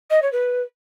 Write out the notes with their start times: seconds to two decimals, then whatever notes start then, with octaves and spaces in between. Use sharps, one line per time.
0.10 D#5
0.22 C#5
0.32 B4